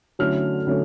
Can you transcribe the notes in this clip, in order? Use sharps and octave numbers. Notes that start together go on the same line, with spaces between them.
D3 F#3 A3 C#4 E4 F6
D3 F#3 A3 C#4